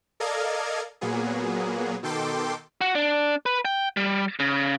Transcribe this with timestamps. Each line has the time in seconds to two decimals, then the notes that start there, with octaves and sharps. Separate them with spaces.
0.20 A4 A#4 D5 D#5 F5 G#6
1.01 A#2 F#3 A#3 B3 G#4
2.03 B2 D#3 A4 G5 C6 D6
2.81 F#4
2.95 D4
3.46 B4
3.65 G5
3.97 G3
4.39 C#3